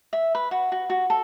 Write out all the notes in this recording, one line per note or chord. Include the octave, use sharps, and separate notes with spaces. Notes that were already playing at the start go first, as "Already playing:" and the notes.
E5
B4
F#4
F#4
F#4
A4